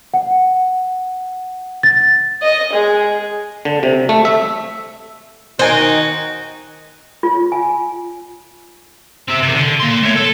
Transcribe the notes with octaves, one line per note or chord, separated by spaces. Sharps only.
F#5
A6
D#5
G#3
D3
C3
A3
E5
D#3 D#4 F#4 C5 G#5 D7
F4
G#5
C4 E5
C3 D#3
D3
A#3 C6
A3 C#5
A4